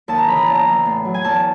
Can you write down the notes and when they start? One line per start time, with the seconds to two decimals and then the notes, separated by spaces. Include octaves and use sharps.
0.08 D#2 A5
0.18 A#5
0.27 C#3 E3 B5
0.37 A#5
0.46 E2 A5
0.54 A#5
0.66 C#3 E3
0.86 A2
1.05 F#3
1.14 G#5
1.24 E2 A5